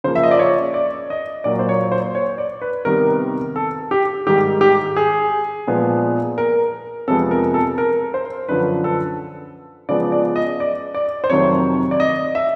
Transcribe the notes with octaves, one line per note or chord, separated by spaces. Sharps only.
C#3 F3 A#3 C5
E5
D#5
D5
C#5
D5
D#5
A#2 F#3 A#3 D5
C5
C#5
C5
C#5
D5
B4
C3 D#3 G3 B3 A#4
A4
G4
G#2 D#3 G3 G4
G4
G#4
A#2 F3 G#3 B3
A#4
F2 C3 F3 G#3 B3 A4
A#4
A4
A#4
C5
F#2 D3 F3 B4
A4
C#3 F3 G#3 B3 D5
D5
D#5
D5
D5
C5
F2 C3 D#3 F#3 A3 C#5
D5
D#5
E5